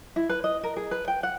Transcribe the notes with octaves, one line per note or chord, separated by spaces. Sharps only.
E4
B4
D#5
A#4
G#4
B4
G5
F#5